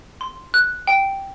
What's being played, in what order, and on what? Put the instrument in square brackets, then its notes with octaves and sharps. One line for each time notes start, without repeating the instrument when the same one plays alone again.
[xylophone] C6
F#6
G5